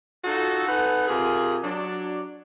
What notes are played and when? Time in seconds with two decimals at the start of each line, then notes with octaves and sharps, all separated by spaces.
0.24 D#4 F4 F#4 A4
0.67 D#4 A4 B4 F#5 G#5
1.07 C3 F4 G#4 A#4 G#5
1.62 F#3 D4